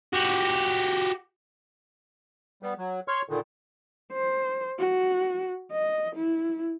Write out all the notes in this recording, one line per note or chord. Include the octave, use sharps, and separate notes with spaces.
F#4 G4
G3 B3
F#3
C#5 C6 C#6 F6
A#2 D3 D#3
C5
F#4
D#5
E4